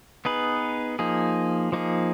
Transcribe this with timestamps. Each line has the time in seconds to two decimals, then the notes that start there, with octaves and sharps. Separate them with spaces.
0.25 B3 D#4 G#4 B4
0.99 F3 A#3 D#4 G#4
1.72 F3 A#3 D#4 G#4